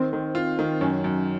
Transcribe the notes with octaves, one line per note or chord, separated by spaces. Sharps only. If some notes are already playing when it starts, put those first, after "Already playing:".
Already playing: D#3 C4
D#3
F4
D#3
F#2 C#4
F#2